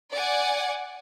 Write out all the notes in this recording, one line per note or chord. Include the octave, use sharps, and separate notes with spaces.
D5 F#5 G#5